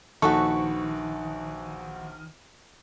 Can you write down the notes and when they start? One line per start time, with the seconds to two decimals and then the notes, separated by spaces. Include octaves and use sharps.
0.22 A#1 D#3 F#4 A4 B4 C5 C#6